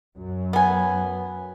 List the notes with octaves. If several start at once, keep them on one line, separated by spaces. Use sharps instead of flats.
F#2
B3 G#5